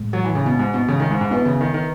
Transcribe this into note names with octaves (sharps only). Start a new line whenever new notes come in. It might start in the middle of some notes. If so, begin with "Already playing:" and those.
Already playing: A2 G#3
F#3
E3
C#3
B2
G#2
B2
C#3
D#3
G#2
G#2
B2 B3 E4 B4 E5
C#3
D#3
D#3